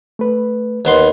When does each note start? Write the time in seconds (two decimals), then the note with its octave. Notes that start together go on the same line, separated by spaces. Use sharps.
0.19 A3 B4
0.85 D#2 B3 C6